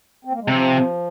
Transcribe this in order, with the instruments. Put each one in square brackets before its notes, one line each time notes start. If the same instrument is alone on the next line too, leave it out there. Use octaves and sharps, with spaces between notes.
[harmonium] C4
A#3
G#3
[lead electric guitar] C3 [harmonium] F3